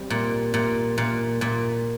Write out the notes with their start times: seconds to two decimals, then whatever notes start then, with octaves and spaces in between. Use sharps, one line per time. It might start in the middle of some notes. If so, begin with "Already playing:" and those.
Already playing: G3 C4
0.10 A#2
0.54 A#2
0.98 A#2
1.41 A#2